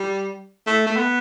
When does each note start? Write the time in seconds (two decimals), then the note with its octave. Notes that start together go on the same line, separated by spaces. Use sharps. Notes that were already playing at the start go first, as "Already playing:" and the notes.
Already playing: G3
0.67 A3
0.87 A3
0.96 B3